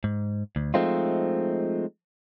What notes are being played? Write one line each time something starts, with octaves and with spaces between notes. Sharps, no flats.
G#2
D2
F3 G#3 A3 C4 D#4 F4